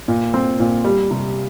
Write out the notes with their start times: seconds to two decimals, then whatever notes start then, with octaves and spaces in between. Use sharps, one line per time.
0.08 A#2
0.34 C4
0.60 A#2
0.84 G3
1.11 C3